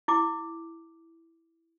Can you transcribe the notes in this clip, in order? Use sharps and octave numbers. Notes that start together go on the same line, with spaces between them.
E4 D6